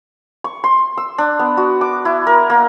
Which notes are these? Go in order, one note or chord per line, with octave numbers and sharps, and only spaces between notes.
C#6
C6
E6
D4
B3
F#4
D6
E4
A#4
A#3